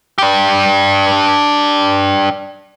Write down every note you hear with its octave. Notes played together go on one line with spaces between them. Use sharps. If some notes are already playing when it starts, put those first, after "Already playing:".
D4 G4